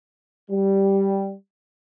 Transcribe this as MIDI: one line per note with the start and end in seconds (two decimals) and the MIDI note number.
0.50 1.33 55